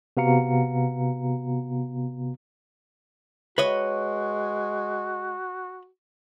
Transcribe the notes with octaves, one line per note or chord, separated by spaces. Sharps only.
C3 B3 F#4 F5 A#5 C#7
G#3 F#4 B4 C#5 D#5